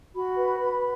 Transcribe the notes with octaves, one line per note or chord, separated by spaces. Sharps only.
F#4 B5
B4
B4